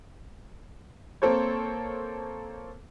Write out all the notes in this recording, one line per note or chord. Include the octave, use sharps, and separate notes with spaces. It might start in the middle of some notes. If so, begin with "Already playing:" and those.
A#3 C4 A4 C5 C#5